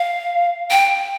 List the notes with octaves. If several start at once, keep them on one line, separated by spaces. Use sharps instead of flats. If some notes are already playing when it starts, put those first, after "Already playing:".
Already playing: F5
G5